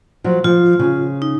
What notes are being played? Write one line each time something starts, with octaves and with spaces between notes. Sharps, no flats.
F3 F#3
F3 F4
C#3
D#4